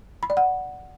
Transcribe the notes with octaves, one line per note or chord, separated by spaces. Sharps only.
B5
D5
F#5